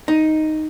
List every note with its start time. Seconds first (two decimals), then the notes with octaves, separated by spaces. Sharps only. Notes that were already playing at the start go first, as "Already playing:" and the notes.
0.08 D#4